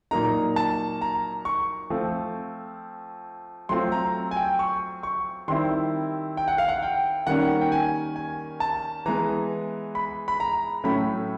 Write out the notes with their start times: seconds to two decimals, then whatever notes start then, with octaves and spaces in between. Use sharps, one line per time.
0.11 A#2 F#3 A#3 D#4 A#5
0.56 A5
1.01 A#5
1.45 C#6
1.90 F3 A3 C4
3.69 F#3 A3 C4 F4 C6
3.92 A#5
4.31 G#5
4.37 G5
4.59 C#6
5.03 C#6
5.48 D#3 G3 C4 E4 C6
6.37 G5
6.48 F#5
6.58 F5
6.68 F#5
6.83 G5
7.27 D#3 G3 A#3 C#4 F#5
7.61 G5
7.72 G#5
8.16 G#5
8.60 A5
9.06 E3 G#3 B3 A#5
9.95 B5
10.28 B5
10.40 A#5
10.84 A2 F#3 A3 C#4 B5